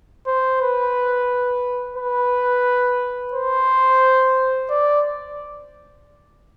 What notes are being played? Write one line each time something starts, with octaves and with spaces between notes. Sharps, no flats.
C5
B4
B4
C5
D5